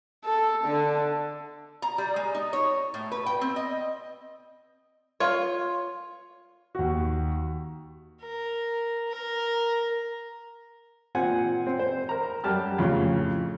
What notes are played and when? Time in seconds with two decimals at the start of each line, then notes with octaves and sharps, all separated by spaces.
0.25 A4
0.65 D3
1.82 A#5
1.98 G3
2.16 G#3
2.34 D#4
2.53 C#5
2.94 A2
3.12 B4
3.26 G5
3.41 C4
3.56 D#5
5.20 F4 C#5
6.75 D#2 F#4
8.22 A#4
9.09 A#4
11.15 A#2 C4 F#5 G#5
11.67 C4
11.79 C5
12.09 A#4 A#5
12.44 F#2 G3 G4 A5 F6
12.78 F2 A2 C#3